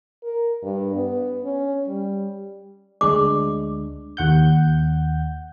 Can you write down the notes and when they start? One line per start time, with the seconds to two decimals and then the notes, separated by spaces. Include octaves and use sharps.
0.23 A#4
0.63 G2
0.95 B3
1.44 C#4
1.87 G3
3.01 D2 G#3 D4 D6
4.17 D#2 F#5 G6